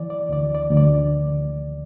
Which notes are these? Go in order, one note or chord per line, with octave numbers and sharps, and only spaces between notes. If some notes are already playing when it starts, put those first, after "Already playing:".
Already playing: E3 D5
D5
D2 D5
D5
D2
D5